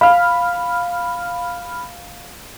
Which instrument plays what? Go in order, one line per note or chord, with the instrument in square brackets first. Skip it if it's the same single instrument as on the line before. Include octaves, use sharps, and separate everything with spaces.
[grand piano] F5 [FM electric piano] B5 F6